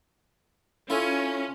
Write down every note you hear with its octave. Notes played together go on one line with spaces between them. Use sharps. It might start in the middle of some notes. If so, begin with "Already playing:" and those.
C#4 E4 F4 A4